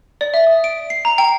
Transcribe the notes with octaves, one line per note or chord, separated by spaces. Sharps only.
D5
E5
D#6
D7
C7
A#5
G5